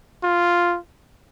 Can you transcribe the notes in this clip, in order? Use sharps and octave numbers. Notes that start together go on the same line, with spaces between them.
F4